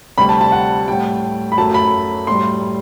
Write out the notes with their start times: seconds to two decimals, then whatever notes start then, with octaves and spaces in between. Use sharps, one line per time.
0.17 D2 C3 G3 B5
0.29 A5
0.41 A5
0.52 F#5
0.88 A2 G3 G5
1.52 B5
1.57 F#2 F#3 A3 A5
1.74 B5
2.27 A2 G3 C6